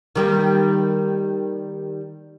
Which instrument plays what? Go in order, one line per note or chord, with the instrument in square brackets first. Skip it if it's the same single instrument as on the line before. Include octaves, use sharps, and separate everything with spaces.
[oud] D#3 G3 A#3